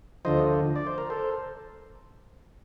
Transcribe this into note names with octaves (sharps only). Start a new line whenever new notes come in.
D2 D3 F3 C5 D#5
D5
C5
A#4
A4 C5